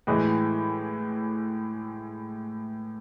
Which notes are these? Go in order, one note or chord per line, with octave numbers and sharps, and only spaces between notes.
A2 E3 G#3